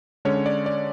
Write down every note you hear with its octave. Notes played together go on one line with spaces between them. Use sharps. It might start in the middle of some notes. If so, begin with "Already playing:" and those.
D3 G#3 C#4 C#5
D5
D5